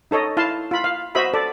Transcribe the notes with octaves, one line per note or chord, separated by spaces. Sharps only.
D#4 A4 C#5 D#5
E4 F5 A5 C6
F4 B5
F5
F#4 C5 D#5 E5 B5
A4 D5